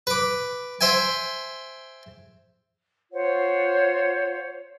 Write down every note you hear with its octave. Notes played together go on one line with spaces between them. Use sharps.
B4 D6
C5 E5 G5 G#5
F4 C5 C#5 F#5